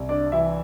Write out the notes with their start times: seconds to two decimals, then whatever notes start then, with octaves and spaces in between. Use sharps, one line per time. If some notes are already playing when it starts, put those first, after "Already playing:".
Already playing: C2
0.09 D4 D5
0.32 E3 E4 E5